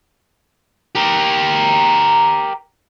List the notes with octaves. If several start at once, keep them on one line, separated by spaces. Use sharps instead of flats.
G4 A#4